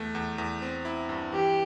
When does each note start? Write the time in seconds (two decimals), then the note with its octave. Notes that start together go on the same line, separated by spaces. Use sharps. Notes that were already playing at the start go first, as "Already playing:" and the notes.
Already playing: E2 A3
0.15 E2
0.38 E2
0.62 C4
0.85 E4
1.09 G2
1.33 E3 G4